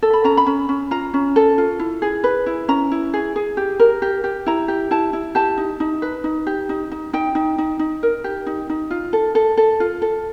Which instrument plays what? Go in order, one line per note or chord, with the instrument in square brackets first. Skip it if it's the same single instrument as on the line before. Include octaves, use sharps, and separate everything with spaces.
[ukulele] A4
B5
C#4 A#5
B5
C#4
C#4
F4 A#5
C#4
A4
F4
E4
G#4
B4
E4
C#4 A#5
E4
G#4
G#4
G4
A#4
G4
G4
E4 A#5
G4
E4 A5
E4
G4 A5
D#4
D#4
B4
D#4
G4
D#4
D#4
D#4 G5
D#4
D#4
D#4
A#4
G4
D#4
D#4
F4
A4
A4
A4
F4
A4